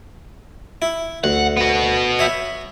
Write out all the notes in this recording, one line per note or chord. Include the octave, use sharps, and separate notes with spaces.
E4
D2 F#5
B3 F#4
C#5 E5 B5